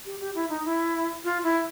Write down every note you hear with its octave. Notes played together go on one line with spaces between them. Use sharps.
G4
G4
E4
D#4
E4
F4
E4